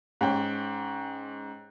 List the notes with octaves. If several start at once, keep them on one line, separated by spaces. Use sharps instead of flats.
G#2 C#4 G5